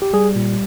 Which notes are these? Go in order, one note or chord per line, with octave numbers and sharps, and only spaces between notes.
G4
G3 G#4
A#2